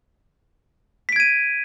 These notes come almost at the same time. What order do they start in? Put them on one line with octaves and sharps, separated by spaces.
B6 D7 G#6 D#7